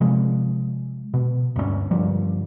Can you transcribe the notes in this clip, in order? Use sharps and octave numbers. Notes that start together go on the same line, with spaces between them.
C3 F3 G#3
B2
D2 G2 F#3 C#4
G2 D3 F3 G3